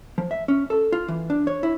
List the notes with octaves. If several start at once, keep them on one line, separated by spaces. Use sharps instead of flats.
F3
E5
C#4
A4
F4
E3
D4
C#5
E4